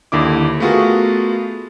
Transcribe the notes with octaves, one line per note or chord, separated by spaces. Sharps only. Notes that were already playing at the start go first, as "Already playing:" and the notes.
D#2 D3 E4 D6
A3 B3 F4 F#4 G#4 A#4